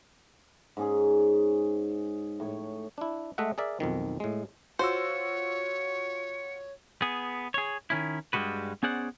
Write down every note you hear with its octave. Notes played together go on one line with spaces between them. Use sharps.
G#2 C#4 G#4
A2 C#5 C#6
D4 E4
G#3 A3 D#5 E5 F#5
G#4 A#4 D5 E5
B1 F2 D#3
A2 G#3
F4 F#4 C5 C#5 E6 C#7
B3 G#4
G#4 C#5
D#3 C#4 E4
G2 G3 G#3 F#4 B4
B3 C#4 G#4 C5 D5 F#5